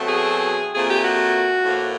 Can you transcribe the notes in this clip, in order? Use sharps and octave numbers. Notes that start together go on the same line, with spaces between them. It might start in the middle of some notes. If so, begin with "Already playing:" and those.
Already playing: B2 F#3 A3 C4
G#4
A#2 F3 A3 C4 G#4
G4
F#4
A2 F3 A#3